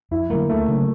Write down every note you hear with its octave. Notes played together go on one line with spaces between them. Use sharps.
F2 E4
D3 F#3 A3 A#3
D2 A3
C#3 F#3 A#3